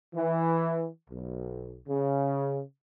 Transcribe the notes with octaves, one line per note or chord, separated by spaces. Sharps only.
E3
B1
C#3